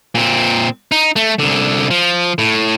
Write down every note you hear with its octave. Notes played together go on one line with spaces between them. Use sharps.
A#2 C4
D#4
A3
C2 D3
F3
A2